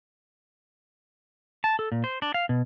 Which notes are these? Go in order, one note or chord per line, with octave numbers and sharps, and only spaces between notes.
A5
A4
A#2
C5
D4
F5
B2